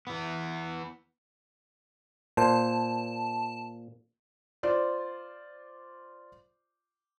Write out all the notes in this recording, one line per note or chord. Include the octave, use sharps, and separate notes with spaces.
E3 B3
A#2 C5 A5
F4 C5 D5